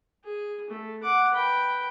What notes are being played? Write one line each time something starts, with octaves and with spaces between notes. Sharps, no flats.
G#4
A3
F#5 D6
B4 G5